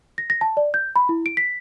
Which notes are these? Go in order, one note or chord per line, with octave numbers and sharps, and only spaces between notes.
A#6
A#6
A5
D5
G6
B5
E4
D7
B6